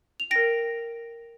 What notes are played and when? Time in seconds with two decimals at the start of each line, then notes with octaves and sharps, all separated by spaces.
0.20 F7
0.31 A#4 G5 A#6 D7